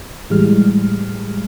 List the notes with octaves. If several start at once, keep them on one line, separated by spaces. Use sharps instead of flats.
A2 E3 G3 G#3 F6